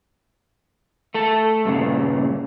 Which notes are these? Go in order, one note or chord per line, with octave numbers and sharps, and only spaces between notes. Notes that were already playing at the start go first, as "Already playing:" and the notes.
A3 A4
G2 A#2 C#3